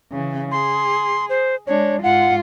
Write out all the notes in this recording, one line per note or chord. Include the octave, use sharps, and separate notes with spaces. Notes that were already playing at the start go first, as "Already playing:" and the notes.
C#3 E3
G#4 C6
C5
G#3 D4 C#5
G#2 F4 F#5